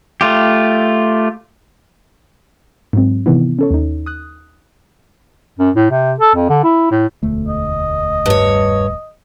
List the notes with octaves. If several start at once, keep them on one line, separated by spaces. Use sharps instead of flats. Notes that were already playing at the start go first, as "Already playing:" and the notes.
A3 F4 G4
G#2 F#3 C4
C3 D#3 E3 B3 E4
C#4 A4 C#5
D#2 D#4
D#6 F#6
F#2
A2
C3
A4
F2
D3
E4
A2
E1 D2 A3
D#5
G2 C#5